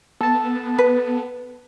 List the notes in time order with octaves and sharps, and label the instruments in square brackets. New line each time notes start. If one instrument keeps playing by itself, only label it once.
[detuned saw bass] B3 [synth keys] A4 A5
[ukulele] B4